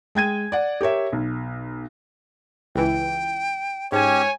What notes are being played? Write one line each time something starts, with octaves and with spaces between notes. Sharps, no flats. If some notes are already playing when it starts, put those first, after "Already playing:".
G#3 G5 G#6 D#7
D5 F#5
G4 A#4 C#5 E5
B1
C#2 E3 G5
G#2 C#4 G4 C#5 G#5